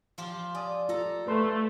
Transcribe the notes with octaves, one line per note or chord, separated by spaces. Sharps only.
F3 F4 G4
D5 G#5 D#6
F4 A4 A#5
A3 B4 C6